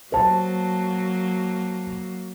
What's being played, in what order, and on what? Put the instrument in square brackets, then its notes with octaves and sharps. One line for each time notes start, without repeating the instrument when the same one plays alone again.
[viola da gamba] F#3 A#3 [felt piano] C5 A5